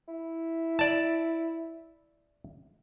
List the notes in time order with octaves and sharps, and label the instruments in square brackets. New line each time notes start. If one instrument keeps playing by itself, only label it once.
[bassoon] E4
[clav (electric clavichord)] D5 A5